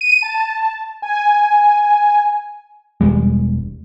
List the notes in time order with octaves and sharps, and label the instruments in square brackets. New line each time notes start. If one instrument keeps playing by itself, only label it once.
[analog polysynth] D#7
A5
G#5
[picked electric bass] E1 G#2 G3 G#3